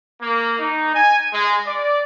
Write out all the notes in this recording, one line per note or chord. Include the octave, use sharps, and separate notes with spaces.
A#3
D#4
G#5
G#3
D5